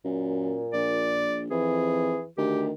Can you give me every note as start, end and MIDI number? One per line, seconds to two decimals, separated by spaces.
0.05 0.62 42
0.05 1.26 46
0.73 1.46 34
0.73 1.40 74
1.51 2.19 41
1.51 2.27 52
1.51 2.22 68
2.38 2.71 38
2.38 2.72 51
2.38 2.63 67